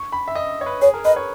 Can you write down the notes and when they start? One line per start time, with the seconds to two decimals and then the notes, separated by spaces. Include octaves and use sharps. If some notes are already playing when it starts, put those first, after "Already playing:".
Already playing: C#6
0.12 B5
0.28 E5
0.35 D#5
0.61 C#5
0.66 B4
0.81 G#4 C#5
0.94 A#4
1.05 B4 D#5
1.16 C#5